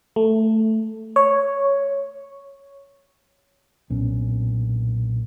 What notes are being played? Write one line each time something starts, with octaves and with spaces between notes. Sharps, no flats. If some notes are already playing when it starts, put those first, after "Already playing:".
A3
C#5
B1 A#2 C#4